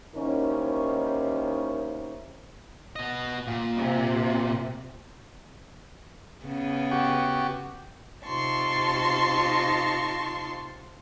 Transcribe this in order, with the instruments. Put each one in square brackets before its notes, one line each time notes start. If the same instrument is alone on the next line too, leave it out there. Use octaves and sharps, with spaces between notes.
[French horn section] D#2 C#4 D#4 E4 A#4 C5
[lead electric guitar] B3 D#5
A#2
[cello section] C3
[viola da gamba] C#3 B3
[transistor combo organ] F#4 G4
[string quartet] C3 D#4 F4 A5 C6 C#6